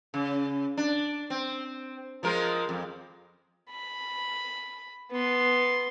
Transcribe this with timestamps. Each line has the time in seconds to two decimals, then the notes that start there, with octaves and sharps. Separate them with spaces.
0.14 C#3
0.77 D4
1.30 C4
2.23 F3 G#3 A#4
2.69 F2
3.70 B5
5.12 B3 C6